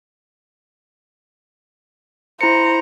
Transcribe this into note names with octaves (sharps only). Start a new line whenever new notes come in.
E4 C5 A#5 C#7